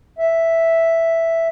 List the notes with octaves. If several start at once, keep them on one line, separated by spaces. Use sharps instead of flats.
E5